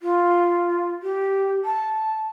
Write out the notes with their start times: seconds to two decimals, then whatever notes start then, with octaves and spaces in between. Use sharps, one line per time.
0.01 F4
1.03 G4
1.65 A5